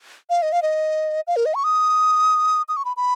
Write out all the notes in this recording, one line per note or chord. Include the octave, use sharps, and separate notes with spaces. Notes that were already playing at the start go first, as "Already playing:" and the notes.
F5
D#5
F5
D#5
F5
A#4
D#5
C#6
D#6
D#6
C#6
B5
B5